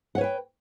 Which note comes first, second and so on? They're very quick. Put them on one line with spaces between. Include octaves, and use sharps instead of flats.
F#5 C#5 B4 G5